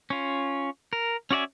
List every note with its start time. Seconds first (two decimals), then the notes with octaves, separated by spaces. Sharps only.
0.10 C#4 F4
0.93 A#4
1.31 C#4 F#4 D5 E5 G#5